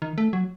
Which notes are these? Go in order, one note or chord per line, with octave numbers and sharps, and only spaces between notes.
D#3
A3
F#3